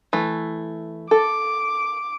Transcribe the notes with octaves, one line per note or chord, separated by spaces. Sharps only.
E3 A3
A4 D6